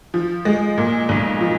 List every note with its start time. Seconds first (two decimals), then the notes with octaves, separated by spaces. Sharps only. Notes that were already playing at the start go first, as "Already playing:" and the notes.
0.14 F3
0.45 G#3
0.78 A#2
1.09 B1
1.40 F3